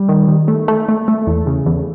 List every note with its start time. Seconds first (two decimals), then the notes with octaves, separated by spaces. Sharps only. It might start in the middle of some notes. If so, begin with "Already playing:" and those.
Already playing: G3
0.09 D#3
0.28 D#3
0.48 A3
0.68 A3
0.88 A3
1.08 A3
1.27 E2
1.47 C#3
1.66 E2